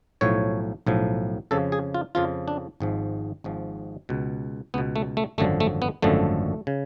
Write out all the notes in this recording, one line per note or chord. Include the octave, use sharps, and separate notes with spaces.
B1 A2 F3 C#5
B1 A2 F3
F2 C#3 F3 A4
G#4
F4
F2 C#3 F3 F4
D4
G#1 G#2 F3
G#1 G#2 F3
C#2 B2
C#2 B2 B3
A3
A3
G#1 F#2 D3 F3 A3
A3
B3
G#1 F#2 D3 F3 A3
C#3